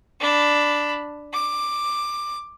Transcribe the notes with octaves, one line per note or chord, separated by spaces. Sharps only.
D4 B5
D6